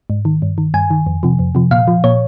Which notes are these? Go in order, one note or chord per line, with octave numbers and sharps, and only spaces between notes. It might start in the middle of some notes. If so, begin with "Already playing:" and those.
G#2
D#3
G2
D#3
G2 G#5
D#3
F2
C3 F3
F2
C3 F3
A#2 F5
F3
A#2 C#5